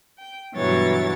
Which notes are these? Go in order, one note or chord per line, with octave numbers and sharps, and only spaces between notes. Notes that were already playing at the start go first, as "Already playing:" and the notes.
G5
G2 B2 E3 F#3 C#5 A6